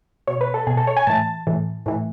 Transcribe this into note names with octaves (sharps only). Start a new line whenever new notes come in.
B2 C#5
B4
A4
B2 G#4
A4
C#5
G#5
A2 E3 A5
A2 E3
A2 E3